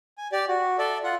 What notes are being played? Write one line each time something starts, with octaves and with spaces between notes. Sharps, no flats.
G#5
G4 D5
F#4
A4 D5 E5
F4 F#5